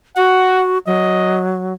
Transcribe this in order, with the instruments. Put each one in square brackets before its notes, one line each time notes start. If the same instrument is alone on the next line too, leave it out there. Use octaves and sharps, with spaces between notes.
[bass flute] F#4 [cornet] F#5
[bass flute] F#3 [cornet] D#5